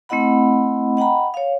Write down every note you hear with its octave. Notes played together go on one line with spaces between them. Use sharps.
A3 C4 E4 D#5 F#5 B5
D#5 F#5 G5 A#5 B5
C#5 F5